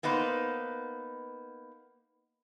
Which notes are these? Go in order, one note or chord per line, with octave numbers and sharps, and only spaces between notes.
A#3 B3 D#4 B4 C5